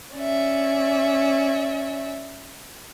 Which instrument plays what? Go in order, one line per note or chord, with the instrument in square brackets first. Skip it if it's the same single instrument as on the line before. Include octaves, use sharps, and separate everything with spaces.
[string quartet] C#4 D5 E5